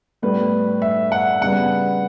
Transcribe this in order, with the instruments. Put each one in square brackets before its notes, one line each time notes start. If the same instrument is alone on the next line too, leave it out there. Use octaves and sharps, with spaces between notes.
[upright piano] A2 G3 B3 B4
E5
F#5
C#3 G3 B3 F#5